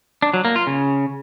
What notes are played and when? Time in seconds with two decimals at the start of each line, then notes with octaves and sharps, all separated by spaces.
0.22 D4
0.34 F#3
0.45 A#3
0.56 F4
0.67 C#3